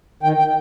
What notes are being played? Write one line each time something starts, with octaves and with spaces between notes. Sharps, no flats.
D#3 G5
G5